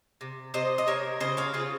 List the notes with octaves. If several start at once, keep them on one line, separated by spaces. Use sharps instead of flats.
C3
C3 C5 D#5
D#5
C3 A#4 C#5
C#3 C5 D#5
C#5 F5
C#3 F4 G#4